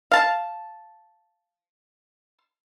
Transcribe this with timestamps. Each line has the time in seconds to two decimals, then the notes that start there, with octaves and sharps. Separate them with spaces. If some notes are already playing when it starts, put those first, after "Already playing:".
0.12 F5 A5